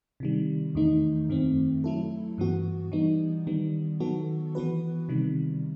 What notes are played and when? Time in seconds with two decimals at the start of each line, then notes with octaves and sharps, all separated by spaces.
0.20 C3 D#3 G3
0.75 E2 D#3 A3 D#4
1.29 F#2 D#3 A3 C4
1.84 F#3 A3 E4 A4
2.38 G2 E3 B3 F#4
2.92 E3 G3 B3 D#4
3.47 D#3 G3 B3
4.00 D#3 F#3 B3 F#4 A4
4.55 E3 B3 F#4 B4
5.09 C3 D#3 G3